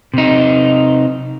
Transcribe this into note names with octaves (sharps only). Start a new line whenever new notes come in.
C3 D#4